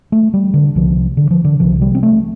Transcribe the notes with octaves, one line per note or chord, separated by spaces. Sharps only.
A3
G3
D3
C2 C3 F3
D3
F3
D3
C2 C3 F3
G3
C4
A3